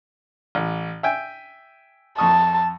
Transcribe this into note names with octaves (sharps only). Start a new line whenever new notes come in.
A1
E5 G5 G#5
F2 A5 C#6 D#6